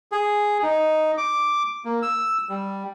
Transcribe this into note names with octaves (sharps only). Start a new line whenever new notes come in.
G#4
D#4
D6
A#3
E6
G3